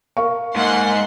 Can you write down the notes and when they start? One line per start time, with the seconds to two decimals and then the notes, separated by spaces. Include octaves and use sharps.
0.17 A#4 F5 C#6
0.56 G#2 A#3 F#5 C6